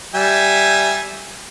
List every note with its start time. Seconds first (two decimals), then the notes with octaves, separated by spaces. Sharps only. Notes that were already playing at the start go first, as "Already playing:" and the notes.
0.15 G3 E5 G#5